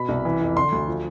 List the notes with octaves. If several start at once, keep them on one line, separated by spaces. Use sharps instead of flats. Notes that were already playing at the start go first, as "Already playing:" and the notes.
Already playing: B2 B5
C2
E3
F2
D3 C6
D2
F3